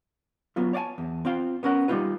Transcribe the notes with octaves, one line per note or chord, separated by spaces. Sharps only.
F#3 B3 F4
C#5 D5 F5 G#5 A5
E2
C4 F4 F5 G5
B3 C#4 A#4 F#5
G3 A#3 C4 D#4 F4 B4